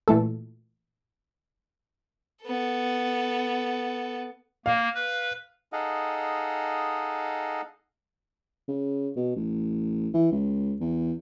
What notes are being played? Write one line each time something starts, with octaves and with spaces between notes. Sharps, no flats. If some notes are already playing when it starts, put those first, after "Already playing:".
A#2 E3 A3 A4
B3 A4
A#3 F5
B4
D#4 G#4 A4 D#5 F5 F#5
C#3
B2
A1
E3
C#2
E2